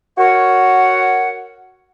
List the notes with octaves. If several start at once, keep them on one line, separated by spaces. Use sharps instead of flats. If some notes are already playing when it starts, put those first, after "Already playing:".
F#4 A#4 C#5 F#5